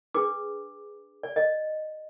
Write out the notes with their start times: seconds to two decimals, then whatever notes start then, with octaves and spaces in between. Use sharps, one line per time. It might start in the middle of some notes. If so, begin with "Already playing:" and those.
0.14 D4 G#4 B4 D6
1.23 D5
1.36 D#5